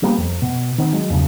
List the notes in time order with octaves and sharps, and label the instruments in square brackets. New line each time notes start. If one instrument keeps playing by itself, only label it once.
[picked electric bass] F3 G3 A#3 B3
F2
B2
D#3 B3 C4
F#3 G#3
E2 G2 C#3 F#3